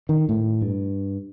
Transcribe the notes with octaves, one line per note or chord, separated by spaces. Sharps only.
D#3
A2
G2